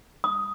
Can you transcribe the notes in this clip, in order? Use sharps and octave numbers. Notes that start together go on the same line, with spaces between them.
D#6